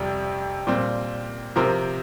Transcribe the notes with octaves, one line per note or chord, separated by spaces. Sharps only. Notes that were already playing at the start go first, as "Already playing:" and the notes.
Already playing: F2 C3 G3
A#2 G3 C4
C3 F3 C4 G4 A#4